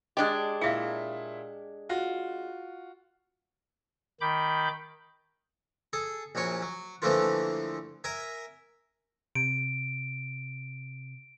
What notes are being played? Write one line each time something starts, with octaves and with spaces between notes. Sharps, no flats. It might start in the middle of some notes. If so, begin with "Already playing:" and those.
G#3 D4 G4 D#5
A#2 E4 G#4 E5 F5
F4 F#4
D#3 B5 D6 G6
G#4 A4
A#1 F#2 F#3 C#5
F#3
D3 E3 F3 A3 A#3 F4
A#4 E5 G#5
C3 D7